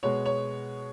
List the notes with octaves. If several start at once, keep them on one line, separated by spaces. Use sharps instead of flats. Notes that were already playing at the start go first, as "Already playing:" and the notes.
B2 G#3 B3 C#5
C#5